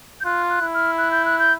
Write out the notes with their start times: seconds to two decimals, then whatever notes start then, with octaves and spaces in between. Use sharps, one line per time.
0.21 G6
0.25 F4 F#6
0.50 F#6
0.61 E4
0.74 F6
0.98 F#6
1.12 G6
1.25 F#6
1.39 G6